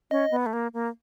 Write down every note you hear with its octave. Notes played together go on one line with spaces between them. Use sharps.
C#4 D#5
B3
A3
A#3
A#3